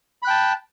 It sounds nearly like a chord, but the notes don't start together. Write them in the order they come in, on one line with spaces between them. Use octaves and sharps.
B5 F#6 G5 A5